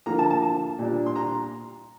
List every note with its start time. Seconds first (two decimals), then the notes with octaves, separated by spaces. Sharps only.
0.06 D3 F3 A#3 A#5
0.19 A5
0.31 A5
0.43 A5
0.79 A#2 G3 D4
1.06 C6
1.16 A#5